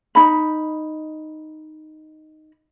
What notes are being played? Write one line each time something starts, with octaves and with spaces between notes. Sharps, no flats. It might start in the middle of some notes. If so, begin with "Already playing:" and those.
D#4 B5